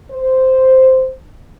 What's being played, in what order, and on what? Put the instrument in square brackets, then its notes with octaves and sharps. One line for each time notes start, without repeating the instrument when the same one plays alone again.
[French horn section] C5